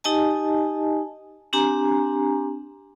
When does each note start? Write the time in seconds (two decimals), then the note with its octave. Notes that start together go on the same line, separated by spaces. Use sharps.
0.04 D#4 G4 D#5 G#5 A5
1.53 C4 D4 G4 G#5 A#5